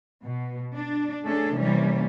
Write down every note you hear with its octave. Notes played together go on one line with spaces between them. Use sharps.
B2
D4
A3 C#4 D4 G#4 A4
C3 E3 G3 A#3 C#4